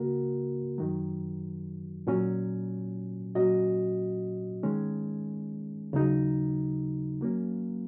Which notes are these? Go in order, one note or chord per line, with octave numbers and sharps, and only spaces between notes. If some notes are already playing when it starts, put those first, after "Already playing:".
Already playing: C#2 C#3 A#3 F#4 A#4
F#2 D#3 F#3
A#2 F#3 C#4
A#2 F#3 C#4 F#4 D#5
D#3 G#3 C#4
D#2 C#3 F#3 D#4
F#3 A#3 C#4